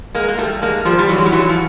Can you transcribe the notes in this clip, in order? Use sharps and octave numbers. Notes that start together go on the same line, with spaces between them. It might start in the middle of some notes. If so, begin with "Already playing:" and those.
G#3 A#3
A#3
G3 A3
G#3 A#3
F3 G3
G3
E3 F#3
G#3
G3
E3 F#3
F3